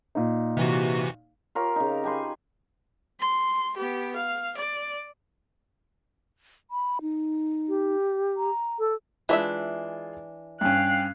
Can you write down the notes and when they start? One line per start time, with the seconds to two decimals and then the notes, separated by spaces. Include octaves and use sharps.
0.15 A#2 D#4
0.57 C3 E3 F#4
1.55 F4 G4 A#4 C#5
1.76 C#3 D#4
2.04 G4 B4 G#5 C6
3.20 C6
3.76 B3 G4
4.15 F5
4.57 D5
6.71 B5
7.02 D#4
7.69 G4
8.37 A#5
8.79 A4
9.29 E3 G#3 D4 F4 G#4 E5
10.61 G2 C#4 F5 G5 F#6